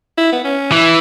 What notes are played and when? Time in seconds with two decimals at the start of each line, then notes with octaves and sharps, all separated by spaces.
0.18 E4
0.32 B3
0.45 C#4
0.72 E3 E4